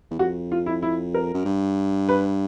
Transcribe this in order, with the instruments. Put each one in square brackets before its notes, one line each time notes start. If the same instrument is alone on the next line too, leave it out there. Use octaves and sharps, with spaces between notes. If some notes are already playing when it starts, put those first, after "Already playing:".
[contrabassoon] E2
[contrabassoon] F2 [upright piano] F#4
[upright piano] F4
E4
E4
A#4
[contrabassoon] F#2
G2
[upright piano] B4